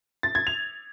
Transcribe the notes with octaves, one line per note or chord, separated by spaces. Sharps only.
A6
G#6
F7